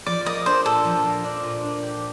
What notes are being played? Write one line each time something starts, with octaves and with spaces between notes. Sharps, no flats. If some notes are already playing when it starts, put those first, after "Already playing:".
F3 D5
A#3 D#5
D4 C5
A#2 A4
F3
A#3
D4
A#2
D4
G4